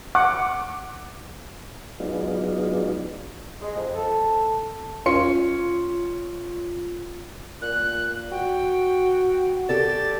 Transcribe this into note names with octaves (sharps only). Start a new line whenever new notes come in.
F#5 D6
F#3 G#3 B3 D4 D#4 F4
G#3
F2
A4
C#4 F4 C6 C#7
A#2 F#6
F#4 G5
G4 A4 D5 A6